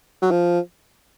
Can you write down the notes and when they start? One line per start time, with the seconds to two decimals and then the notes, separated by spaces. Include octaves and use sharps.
0.22 F#3
0.31 F3